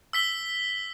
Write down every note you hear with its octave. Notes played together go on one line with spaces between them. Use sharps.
E6 B6 G7